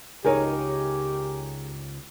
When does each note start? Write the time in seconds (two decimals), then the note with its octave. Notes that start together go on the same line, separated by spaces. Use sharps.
0.25 C#2 D#4 G4 G#4 A#4 C#5